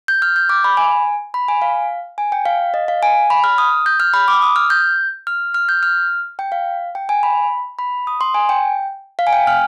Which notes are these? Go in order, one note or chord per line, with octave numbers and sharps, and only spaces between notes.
G6
F6
G6
D6
B5
G#5
B5
G#5
F5
G#5
G5
F5
D#5
F5
G#5
B5
F6
D#6
G6
F6
B5
D6
D#6
F6
G6
F6
F6
G6
F6
G5
F5
G5
G#5
B5
B5
D#6
C6
G#5
G5
F5
G#5
G5
F6